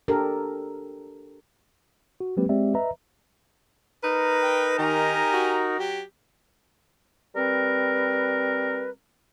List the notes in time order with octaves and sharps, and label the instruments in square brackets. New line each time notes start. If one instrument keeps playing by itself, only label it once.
[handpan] D4 G4 A4 A#4
[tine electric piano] F#4
F#3 G#3 A#3 C4 G4 B4
G#3 C4 G4 D5 E5
B4 D#5 E5 A#5
[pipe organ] D#4 A#4 [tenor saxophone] B4
[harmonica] G5
[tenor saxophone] D#3 [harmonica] G4 G#5 A#5
[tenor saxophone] F#4
[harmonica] F#3 G4
[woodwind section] G3 C4 A#4 B4